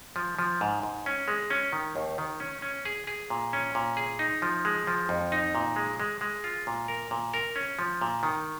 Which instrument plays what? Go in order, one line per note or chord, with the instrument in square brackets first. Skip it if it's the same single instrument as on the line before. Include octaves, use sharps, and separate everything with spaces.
[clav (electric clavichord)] F3
F3
G#2
G#2
C#4
G#3
C#4
D#3
D#2
D#3
C#4
C#4
G#4
G#4
A#2
C#4
A#2
G#4
D#4
F3
G#3
F3
F2
D#4
A#2
G#3
G#3
G#3
F4
A#2
A#4
A#2
A#4
C#4
F3
A#2
D#3